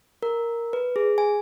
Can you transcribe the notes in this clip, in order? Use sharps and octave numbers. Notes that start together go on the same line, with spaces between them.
A#4
B4
G#4
G#5